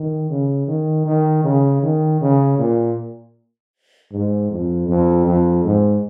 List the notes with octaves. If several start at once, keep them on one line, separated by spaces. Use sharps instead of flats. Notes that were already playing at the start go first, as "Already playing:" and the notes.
Already playing: D#3
C#3
D#3
D#3
C#3
D#3
C#3
A#2
G#2
F2
F2
F2
G#2